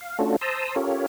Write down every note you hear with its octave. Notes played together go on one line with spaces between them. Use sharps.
F5
A3 C#4 D4 F4 F#4 A4
C5 A5 A#5 C6 D#6 E6
C#4 F4 G4 A4 A#4 C#5